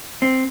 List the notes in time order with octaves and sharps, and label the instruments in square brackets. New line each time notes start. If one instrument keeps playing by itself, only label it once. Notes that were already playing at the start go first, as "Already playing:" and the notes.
[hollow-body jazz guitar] C4